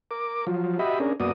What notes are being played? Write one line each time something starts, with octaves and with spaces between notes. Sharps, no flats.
A#4 D6
F3 F#3 F4
F#4 G4 D#5 E5 B5
C#4 D4 G#4 A#4
F#2 A#3 B3 F#4 D5 D#6